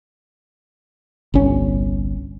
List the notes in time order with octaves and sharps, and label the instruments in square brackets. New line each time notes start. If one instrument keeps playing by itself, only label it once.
[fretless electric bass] G1 C2 C#4